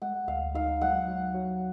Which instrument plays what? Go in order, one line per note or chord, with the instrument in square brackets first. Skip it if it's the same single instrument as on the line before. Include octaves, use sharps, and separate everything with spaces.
[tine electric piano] G#3 [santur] F#5
[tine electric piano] D2 [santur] F5
[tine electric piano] D#4 [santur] F5
[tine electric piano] F#3 [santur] F#5
[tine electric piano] F#3
F#3